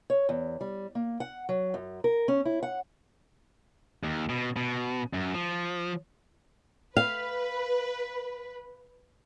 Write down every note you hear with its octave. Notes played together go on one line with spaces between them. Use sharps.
C#5
E2
G3
A#3
F#5
F#3
F#2
A#4
C#4
E4
F#5
D#2
B2
B2
F#2
F3
B4 F5